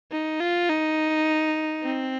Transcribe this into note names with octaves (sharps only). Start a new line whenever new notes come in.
D#4
F4
D#4
C4